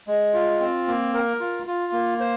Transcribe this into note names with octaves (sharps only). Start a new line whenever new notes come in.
G#3
F4
C4
A#3
A#4
F4
F4
A#3
C5